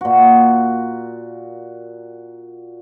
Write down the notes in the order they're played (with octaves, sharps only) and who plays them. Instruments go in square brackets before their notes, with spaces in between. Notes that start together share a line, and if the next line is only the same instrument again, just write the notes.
[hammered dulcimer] A#2 F#4